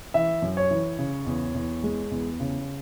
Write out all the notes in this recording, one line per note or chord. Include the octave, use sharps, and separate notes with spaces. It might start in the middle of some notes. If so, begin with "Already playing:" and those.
E3 E5
F#2
C#5
E3
C#3
E2
E2
G#3
E2
C#3